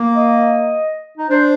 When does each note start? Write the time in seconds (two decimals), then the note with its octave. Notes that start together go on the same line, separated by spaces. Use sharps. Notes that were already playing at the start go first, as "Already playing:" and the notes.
Already playing: A#3
0.15 D#5
1.18 D#4
1.30 D4 C5